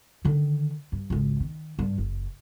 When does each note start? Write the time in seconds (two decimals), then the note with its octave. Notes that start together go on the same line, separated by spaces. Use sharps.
0.25 D3 D#3
0.92 G2
1.10 G#1 C#2
1.40 D#3
1.79 G2
1.98 F#1